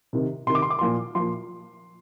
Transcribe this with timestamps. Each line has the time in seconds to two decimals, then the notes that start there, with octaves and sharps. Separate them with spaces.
0.13 C3 D#3
0.47 C3 D#3 C6
0.55 D6
0.62 C6
0.70 D6
0.79 A#2 F3 C6
1.15 A#2 F3 C6